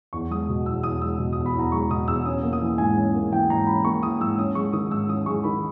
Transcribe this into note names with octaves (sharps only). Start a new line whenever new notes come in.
E2 C#6
G#3 D#6
B2
E2 E6
E2 D#6
G#3 E6
B2
D#6
E2
B5
E2 A#5
G#3 C#6
B2 D#6
E2 E6
C#4 D#6
A#3
D#6
E3
G#2 G#5
C#4
A#3
E3 G5
G#2 A#5
C#4 B5
A#3 C#6
E3 D#6
G#2 E6
C#4 D#6
G#3 C#6
D#3 D#6
G#2 E6
C#4 D#6
G#3 C#6
D#3 B5